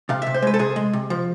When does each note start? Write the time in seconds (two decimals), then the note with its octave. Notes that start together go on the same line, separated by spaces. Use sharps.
0.09 C3 F5
0.22 C3 E5
0.34 C5
0.42 G#3 B4
0.54 A4
0.59 C3 G#4
0.76 G#3
0.93 C3
1.10 F3